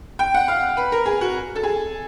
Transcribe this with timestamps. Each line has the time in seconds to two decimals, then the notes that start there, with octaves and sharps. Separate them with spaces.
0.19 G5
0.34 F#5
0.48 F5
0.77 B4
0.92 A#4
1.06 G#4
1.21 F#4
1.56 A4
1.63 G#4